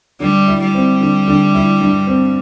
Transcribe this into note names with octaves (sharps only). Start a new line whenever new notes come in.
D3 G3
E4
G3
C4
D3
D3
E4
G2
C4